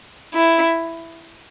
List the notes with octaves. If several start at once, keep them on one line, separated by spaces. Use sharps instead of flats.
E4